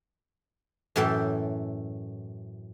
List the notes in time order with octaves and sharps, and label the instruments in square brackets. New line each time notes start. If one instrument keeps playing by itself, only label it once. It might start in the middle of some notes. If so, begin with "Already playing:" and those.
[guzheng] F#2 A2 E3 A4 E5 G5